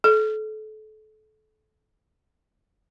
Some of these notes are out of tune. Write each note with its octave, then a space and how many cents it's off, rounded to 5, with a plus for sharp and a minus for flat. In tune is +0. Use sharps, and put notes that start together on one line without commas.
A4 -30